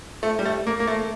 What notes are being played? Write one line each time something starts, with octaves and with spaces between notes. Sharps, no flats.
A3
G3
A3
A#3
A#3
A3